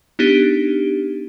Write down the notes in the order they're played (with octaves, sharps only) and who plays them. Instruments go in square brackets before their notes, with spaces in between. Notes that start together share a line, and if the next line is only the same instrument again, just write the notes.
[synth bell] B3 D4 D#4 G4